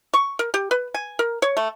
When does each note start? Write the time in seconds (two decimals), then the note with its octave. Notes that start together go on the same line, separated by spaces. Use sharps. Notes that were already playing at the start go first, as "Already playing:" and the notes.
0.14 C#6
0.39 A#4
0.54 G4
0.71 B4
0.94 G#5
1.19 A#4
1.42 C#5
1.57 A3